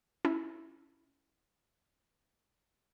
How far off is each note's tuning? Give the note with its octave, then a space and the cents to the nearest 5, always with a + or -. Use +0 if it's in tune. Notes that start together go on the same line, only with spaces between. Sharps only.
C#4 +0 E4 +0